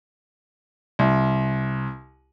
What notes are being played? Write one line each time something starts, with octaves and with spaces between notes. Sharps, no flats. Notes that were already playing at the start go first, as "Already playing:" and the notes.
C2